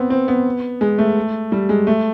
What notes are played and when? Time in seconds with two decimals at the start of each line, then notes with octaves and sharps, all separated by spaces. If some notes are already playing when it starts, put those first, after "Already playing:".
Already playing: B3 C4
0.10 C4
0.28 B3
0.81 G#3
0.98 A3
1.52 G3
1.69 G#3
1.87 A3